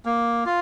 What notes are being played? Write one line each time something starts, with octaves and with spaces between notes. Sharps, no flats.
A#3
F4